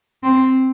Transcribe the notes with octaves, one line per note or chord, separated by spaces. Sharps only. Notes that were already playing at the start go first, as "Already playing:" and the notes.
C4